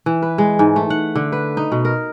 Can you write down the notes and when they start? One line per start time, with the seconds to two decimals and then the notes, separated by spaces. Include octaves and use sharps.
0.06 E3
0.22 B4
0.38 G#3
0.59 G#2
0.76 A3
0.90 F#5
1.15 D3
1.32 B4
1.57 D#4
1.72 B2
1.85 A#4